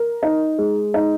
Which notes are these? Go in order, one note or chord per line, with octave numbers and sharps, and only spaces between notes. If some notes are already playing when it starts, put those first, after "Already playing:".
Already playing: A#4
D#4
G#3
D#4